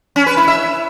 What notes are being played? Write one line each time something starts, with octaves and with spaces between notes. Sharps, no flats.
C#4
B4
E4
E5